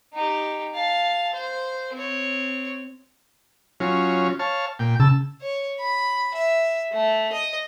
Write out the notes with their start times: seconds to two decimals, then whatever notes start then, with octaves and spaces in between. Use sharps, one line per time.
0.13 D#4 G4
0.75 F5 A5
1.33 C5
1.93 C4 C#5
3.80 F#3 C#4 F4
4.39 C#5 F5 A5
4.79 A#2 G5
5.00 C#3 A5 E6
5.42 C#5
5.79 B5
6.35 E5
6.93 A3
7.33 D#5